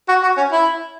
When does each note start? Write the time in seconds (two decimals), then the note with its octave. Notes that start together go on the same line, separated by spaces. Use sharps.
0.09 F#4
0.23 F#4
0.37 C#4
0.52 E4